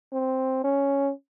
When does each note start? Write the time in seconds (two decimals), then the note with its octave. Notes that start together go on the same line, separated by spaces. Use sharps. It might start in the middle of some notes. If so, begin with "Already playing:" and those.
0.13 C4
0.64 C#4